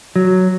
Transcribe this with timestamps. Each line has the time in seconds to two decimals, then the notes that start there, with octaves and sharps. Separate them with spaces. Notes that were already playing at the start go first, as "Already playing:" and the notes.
0.16 F#3